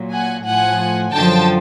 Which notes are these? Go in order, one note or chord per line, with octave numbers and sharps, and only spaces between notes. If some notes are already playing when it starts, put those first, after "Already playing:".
Already playing: A#2 F#3
F#5 G#5
A2 F3 F#5 G#5
F#2 D3 F3 G5 A5